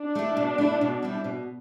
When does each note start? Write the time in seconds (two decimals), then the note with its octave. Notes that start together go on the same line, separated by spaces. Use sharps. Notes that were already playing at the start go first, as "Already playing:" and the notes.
Already playing: D4
0.15 A3 E4
0.37 B2
0.58 A3 E4
0.81 B2
1.03 G3 C4 E4
1.24 B2